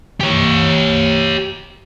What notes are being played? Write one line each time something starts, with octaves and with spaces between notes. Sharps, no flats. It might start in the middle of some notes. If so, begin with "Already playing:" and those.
G4 C#5